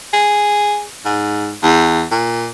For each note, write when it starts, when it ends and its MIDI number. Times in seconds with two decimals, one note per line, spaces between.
0.13 0.83 68
1.05 1.54 44
1.63 2.04 40
2.11 2.51 46